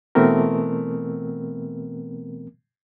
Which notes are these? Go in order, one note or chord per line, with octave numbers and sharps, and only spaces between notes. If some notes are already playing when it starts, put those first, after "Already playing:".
B2 E3 A3 B3 C4 A#4